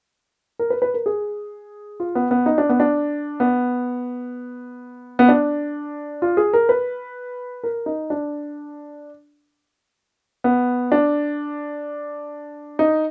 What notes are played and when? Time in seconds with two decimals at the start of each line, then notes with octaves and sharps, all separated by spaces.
0.59 A#4
0.70 B4
0.82 B4
0.94 A#4
1.06 G#4
2.00 F4
2.15 B3
2.31 B3
2.46 D#4
2.58 D4
2.69 B3
2.80 D4
3.40 B3
5.19 B3
5.28 D4
6.22 F4
6.37 G#4
6.53 A#4
6.69 B4
7.63 A#4
7.86 D#4
8.10 D4
10.44 B3
10.92 D4
12.79 D#4